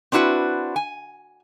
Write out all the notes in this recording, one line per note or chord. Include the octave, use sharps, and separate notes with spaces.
C4 D4 E4 F#4 B4
G#5